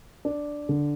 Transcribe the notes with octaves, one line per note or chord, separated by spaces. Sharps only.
D4
D3